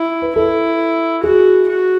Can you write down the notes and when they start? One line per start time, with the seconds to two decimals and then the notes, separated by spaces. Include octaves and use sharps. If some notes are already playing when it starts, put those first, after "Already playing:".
Already playing: E4
0.22 B4
0.36 E4 A4
1.23 F#4 G#4
1.68 F#4